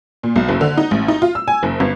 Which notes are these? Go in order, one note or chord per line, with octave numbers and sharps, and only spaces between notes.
A#2
B1
F#1
D3
D#4
A1
D#4
F4
E6
G#5
F#1
G1